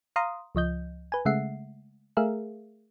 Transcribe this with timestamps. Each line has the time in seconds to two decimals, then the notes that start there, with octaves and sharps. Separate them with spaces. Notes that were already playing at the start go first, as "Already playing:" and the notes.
0.16 F5 A#5 C6 D#6
0.55 C#2 F3 D#5 G6
1.12 B4 G#5
1.25 C#3 G#3 A3 E5 F#5 C7
2.17 A3 G#4 A#4 E5 F5